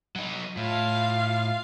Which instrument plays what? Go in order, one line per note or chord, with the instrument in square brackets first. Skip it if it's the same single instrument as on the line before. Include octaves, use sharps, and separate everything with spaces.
[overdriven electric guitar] F#3 D#4
[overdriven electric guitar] A2 [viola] F4 F5